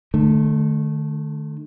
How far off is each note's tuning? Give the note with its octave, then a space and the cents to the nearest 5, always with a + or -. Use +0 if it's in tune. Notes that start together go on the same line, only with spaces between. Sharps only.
D3 +45 A3 -15